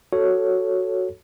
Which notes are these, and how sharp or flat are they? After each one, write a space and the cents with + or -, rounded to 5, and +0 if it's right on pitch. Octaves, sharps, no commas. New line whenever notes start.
F#4 +0 A4 +0 C#5 +0